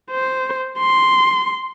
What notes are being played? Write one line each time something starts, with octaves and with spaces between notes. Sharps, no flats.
C5
C6